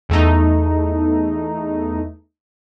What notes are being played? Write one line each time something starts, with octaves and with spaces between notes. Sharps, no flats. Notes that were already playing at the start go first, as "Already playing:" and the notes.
E2 A3 D#4